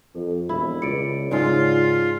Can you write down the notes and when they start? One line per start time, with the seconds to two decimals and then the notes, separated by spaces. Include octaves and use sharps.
0.15 F2 A4
0.49 E1 E4
0.82 C#2 D5 C#7 D7
1.31 G#2 C#3 G#3 D#4 F4 A4 C#5 D5